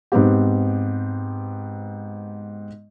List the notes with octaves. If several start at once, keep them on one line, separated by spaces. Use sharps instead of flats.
G#2 B3 C4 G4